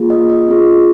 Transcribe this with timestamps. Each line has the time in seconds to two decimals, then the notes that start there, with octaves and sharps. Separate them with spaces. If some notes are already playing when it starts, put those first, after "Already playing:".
Already playing: A#3 F4 G#4
0.10 D#5
0.30 D#5
0.48 C4 F4 G#4